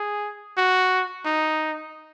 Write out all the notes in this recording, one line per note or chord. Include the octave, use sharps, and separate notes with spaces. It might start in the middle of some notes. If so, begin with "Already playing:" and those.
Already playing: G#4
F#4
D#4